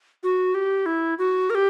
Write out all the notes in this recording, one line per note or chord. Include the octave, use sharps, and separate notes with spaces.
F#4
G4
E4
F#4
A#4
G4